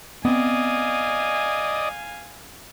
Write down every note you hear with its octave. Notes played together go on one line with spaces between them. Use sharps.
B3 C4 D5 D#5 F5 G#5